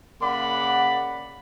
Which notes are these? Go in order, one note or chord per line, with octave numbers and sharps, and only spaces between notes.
C#3 A#3 D5 F#5 B5